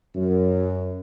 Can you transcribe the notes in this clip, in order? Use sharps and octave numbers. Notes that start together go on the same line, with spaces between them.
F#2